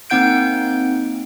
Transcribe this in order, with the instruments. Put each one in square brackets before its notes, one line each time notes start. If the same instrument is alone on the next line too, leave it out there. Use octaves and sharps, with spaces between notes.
[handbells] A#3 C4 D#4 F#5 G6 D7